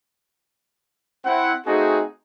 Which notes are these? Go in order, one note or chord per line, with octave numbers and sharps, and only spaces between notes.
C4 E4 F#5
A3 C4 D#4 F#4 G#4 G#5